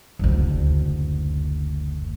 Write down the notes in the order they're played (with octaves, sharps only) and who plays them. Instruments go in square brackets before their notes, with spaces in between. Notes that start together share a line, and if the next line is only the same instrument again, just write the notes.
[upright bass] F#1 D2